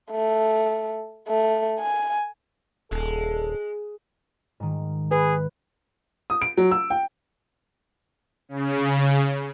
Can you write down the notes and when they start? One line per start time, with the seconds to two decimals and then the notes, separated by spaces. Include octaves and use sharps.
0.11 A3
1.28 A3
1.79 G#5
2.91 D#1 G#3 A4
4.60 G#2 D#3
5.11 G#4 B4
6.30 D#6
6.42 D7
6.57 F#3
6.71 E6
6.90 G5
8.49 C#3